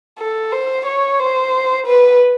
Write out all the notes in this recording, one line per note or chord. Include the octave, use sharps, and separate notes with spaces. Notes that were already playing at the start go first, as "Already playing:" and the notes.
A4
C5
C#5
C5
B4